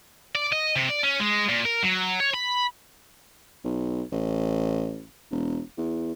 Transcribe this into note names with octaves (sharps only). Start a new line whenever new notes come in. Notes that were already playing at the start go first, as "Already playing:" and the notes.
D5
D#5
C3
D5
C#4
G#3
A#2
A#4
F#3
C#5
B5
B1
A1
E1
E2